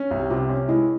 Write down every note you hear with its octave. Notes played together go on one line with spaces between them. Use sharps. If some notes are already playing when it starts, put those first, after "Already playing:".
Already playing: C#4
C2
G4
C3 F4
C#4
G#3 E4